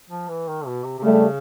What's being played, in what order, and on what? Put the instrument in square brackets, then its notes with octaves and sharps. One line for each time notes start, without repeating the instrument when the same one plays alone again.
[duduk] F3
E3
D#3
B2
C3
C3
[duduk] C#3 [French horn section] G3 A3